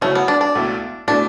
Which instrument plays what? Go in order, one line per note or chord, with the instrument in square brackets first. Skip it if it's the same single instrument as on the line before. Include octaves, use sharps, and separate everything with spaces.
[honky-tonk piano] C#3 F#3 C#4 E4 [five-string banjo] A3
[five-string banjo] B3
D4
D4
[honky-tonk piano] C#2 B2 A3 E4
[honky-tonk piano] B2 A3 E4 [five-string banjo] D4